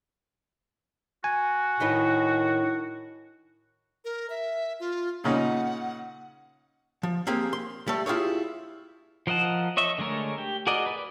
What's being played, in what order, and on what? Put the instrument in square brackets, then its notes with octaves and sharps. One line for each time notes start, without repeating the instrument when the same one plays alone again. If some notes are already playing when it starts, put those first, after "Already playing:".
[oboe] F#4 [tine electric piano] G#5
[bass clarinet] A2 [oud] D#3 D#4 B4
[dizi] A#4
E5
F4
[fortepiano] A#2 C#3 D#4 [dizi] F#5
[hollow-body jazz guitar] F3
A#3 C4 G4 G#4
C6
G3 A3
E4 F4 G4 G#4 C#5
[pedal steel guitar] F3 A#4 D#5 F#5 A5
C#5 D#5 E5 C#6
D3 G#3 A3 A#4 C#5
G4
F#4 G#4 A#4 D5 D#5
B4 D5